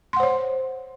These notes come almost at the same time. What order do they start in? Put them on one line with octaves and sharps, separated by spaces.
C6 F#5 C5 C#5